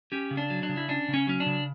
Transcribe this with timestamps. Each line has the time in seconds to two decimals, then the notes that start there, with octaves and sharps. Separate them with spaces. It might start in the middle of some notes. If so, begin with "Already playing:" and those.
0.12 C#4 G4
0.31 C#3
0.37 D4
0.50 F#3
0.63 D4
0.69 C#3
0.77 E4
0.89 C#4 D4
1.08 C#3
1.14 C#4
1.27 F#3 C#4
1.40 D4
1.46 C#3